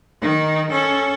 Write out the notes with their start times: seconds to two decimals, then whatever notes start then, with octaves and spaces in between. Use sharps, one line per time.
0.21 D#3 D#4
0.70 C#4 A4